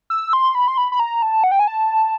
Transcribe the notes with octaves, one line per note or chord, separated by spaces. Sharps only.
E6
C6
B5
C6
B5
B5
A#5
A5
F#5
G5
G#5
A5